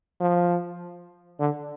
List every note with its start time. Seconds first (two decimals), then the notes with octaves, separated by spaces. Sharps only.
0.20 F3
1.40 D3